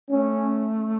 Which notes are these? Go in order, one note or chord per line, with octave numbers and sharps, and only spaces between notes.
A3 C#4